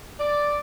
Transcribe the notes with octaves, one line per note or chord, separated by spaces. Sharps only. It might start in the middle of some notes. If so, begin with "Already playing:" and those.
D5